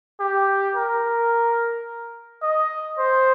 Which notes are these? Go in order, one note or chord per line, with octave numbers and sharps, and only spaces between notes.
G4
A#4
D#5
C5